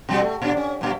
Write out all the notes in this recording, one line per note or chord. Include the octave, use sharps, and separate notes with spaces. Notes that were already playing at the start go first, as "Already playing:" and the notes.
B2 G3 F#4
A3
A#2 D4
C#4
G2 A#2